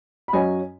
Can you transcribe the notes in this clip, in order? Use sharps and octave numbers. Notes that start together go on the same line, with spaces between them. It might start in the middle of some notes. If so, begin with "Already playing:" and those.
B5
F#2 F#3 C#4 D#5 G#5